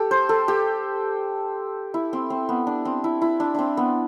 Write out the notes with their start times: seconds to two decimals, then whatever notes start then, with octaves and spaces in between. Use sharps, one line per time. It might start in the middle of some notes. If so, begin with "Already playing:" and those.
Already playing: G4 A4
0.11 C5
0.29 A4
0.48 G4
1.94 E4
2.13 C4
2.30 C4
2.49 B3
2.67 D4
2.85 C4
3.04 E4
3.22 E4
3.40 D4
3.54 C4 D4
3.77 B3